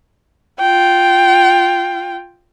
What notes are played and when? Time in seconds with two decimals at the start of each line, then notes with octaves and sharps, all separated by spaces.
0.60 F4 G5